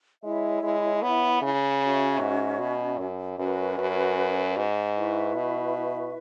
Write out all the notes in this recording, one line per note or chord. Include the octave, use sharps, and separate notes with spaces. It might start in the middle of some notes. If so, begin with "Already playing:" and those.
G#3 E4 C#5 E5
G#3
B3
C#3
C#4 F#4 E5
G#2
B2
F#2
F#2 C#4 F#4 B4
F#2
G#2
E4 B4 E5 C#6
B2